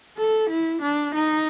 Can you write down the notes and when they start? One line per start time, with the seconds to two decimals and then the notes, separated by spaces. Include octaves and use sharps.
0.18 A4
0.50 E4
0.82 D4
1.15 D#4